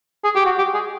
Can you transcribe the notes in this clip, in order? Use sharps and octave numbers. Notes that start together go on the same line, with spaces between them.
G#4
G4
F#4
G4
G#4